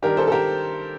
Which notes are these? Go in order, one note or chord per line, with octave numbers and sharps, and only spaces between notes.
D#3 G3 D4 G4 A#4
A4 C5
A4
G4 A#4